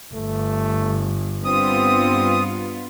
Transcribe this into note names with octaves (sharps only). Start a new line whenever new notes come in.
G1 A3
G2 B3 C4 F4 D#6